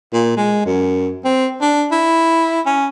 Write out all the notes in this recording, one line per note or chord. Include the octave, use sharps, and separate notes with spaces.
A#2
G#3
F#2
C4
D4
E4
C#4